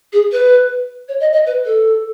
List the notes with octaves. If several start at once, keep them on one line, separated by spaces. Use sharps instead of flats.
G#4
B4
C#5
D#5
D#5
B4
A4